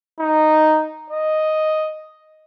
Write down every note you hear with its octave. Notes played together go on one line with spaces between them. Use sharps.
D#4
D#5